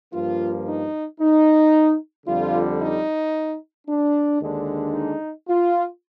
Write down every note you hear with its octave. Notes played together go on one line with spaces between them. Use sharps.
G2 F3 A#3 F4
D#4
D#4
F2 D3 G3 F4
D#4
D4
D#2 D3 G#3 D4
D#4
F4